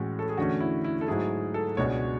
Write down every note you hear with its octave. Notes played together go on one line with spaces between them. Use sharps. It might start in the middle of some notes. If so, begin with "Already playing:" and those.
Already playing: A2 E3 G#3 C#4 F#4
A4
G#4
E2 D3 A3 C#4 F#4
E4
E4
A4
G#2 F#3 A3 E4 G#4
A4
C#2 B2 G#3 D4 C#5